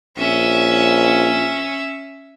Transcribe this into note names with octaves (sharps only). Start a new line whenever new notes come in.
A#1 C#4 E5